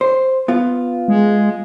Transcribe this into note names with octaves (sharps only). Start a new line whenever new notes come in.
C5
B3 F4
G#3